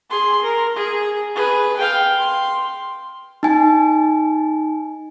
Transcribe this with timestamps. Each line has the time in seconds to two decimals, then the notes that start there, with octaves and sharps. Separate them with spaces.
0.10 G#4 C6
0.42 A#4
0.76 G#4
1.35 G#4 B4
1.77 F5 G5
2.19 C6
3.43 D#4 G#5